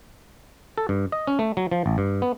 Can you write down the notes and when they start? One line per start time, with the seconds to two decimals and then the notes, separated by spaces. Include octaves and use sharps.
0.78 A4
0.89 G2
1.12 D#5
1.27 C#4
1.39 A3
1.57 F#3
1.72 F3
1.86 A1
1.98 G2
2.22 B3